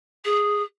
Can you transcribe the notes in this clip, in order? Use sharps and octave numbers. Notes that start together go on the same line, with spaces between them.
G#4